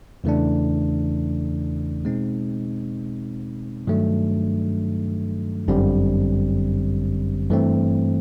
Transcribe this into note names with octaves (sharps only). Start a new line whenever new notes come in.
E2 C#3 E3 A3 D4
B2 G#3 C4 D#4
G2 D#3 F#3 A3 D4
G1 F#2 D3 G3 C4
G2 E3 A3 C4